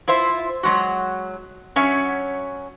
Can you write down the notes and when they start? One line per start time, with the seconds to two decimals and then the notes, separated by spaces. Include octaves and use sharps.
0.08 E4 F4 C5 E5
0.63 F#3 G#3 F#4
1.76 F#3 C#4 C#5 E5